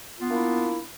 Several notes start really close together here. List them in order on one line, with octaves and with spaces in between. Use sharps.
F4 B3 D4 A#3 E4